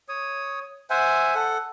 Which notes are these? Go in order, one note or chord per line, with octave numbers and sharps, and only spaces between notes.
C#5 D#6
C5 E5 F#5 G#5
A4 F#5